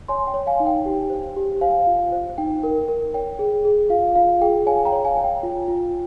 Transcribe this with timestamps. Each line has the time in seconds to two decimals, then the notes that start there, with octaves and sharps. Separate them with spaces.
0.08 C#5 G#5 C6
0.27 G5
0.34 C#5
0.47 F5 G#5
0.60 D#4
0.66 G5
0.86 G4
1.10 C5
1.36 G4
1.61 C5 F5 G#5
1.87 F4
2.12 C5
2.38 D#4 G5
2.63 A#4
2.88 A#4
3.14 C#5 G5
3.39 G#4
3.65 G#4
3.90 F4 F5
4.15 F4 F5
4.41 G#4 G5
4.66 C#5 F5 G#5
4.85 G5 A#5
4.92 C#5
5.05 F5 G#5
5.17 C#5
5.24 G5
5.43 F4
5.68 F4